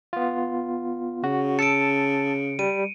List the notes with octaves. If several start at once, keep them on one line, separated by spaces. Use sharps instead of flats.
B3 F4
C#3 F#4
A5 E6 A6 C#7 D7
G3 D#7